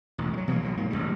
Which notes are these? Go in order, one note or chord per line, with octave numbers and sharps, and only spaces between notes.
E1 A1
F#3 G#3
B2 E3 F3 A#3
B1 B2 F#3
G#2 A#3
A1 A2 C#3 G3